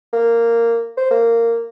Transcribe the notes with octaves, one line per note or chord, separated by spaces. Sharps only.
A#3
C5
A#3